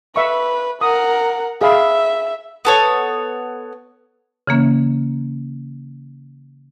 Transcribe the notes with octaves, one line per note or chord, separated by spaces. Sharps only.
B4 E5 C#6
A#4 F#5 D#6
G#4 E5 F5 B5
B3 A4 C#5
C#3 E3 A#3 C#4